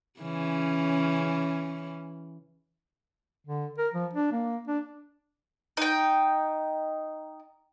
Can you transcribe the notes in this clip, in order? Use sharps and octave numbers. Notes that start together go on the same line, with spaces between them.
C#3 E3 C#4
D3
A#4
F3
D4
A#3
D4
D#4 G5